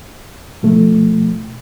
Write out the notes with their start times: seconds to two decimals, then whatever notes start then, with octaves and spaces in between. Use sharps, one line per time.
0.63 B2 F3 A3